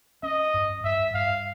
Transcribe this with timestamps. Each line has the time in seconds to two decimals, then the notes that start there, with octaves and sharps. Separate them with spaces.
0.23 C#4 D#5
0.54 G2
0.84 G2 E5
1.14 G2 F5